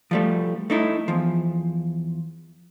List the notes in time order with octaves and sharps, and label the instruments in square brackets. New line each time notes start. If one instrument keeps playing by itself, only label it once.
[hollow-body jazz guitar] F3 G3 A3
A3 D#4 E4
E2 F3